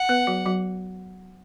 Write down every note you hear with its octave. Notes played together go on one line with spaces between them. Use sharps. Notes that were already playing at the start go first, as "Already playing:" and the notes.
Already playing: F#5
B3 B4
F#3 F#4
F#3 F#4